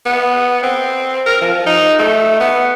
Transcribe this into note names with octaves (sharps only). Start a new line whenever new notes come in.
B3
C4
A#4
F3
D#4
A3
B3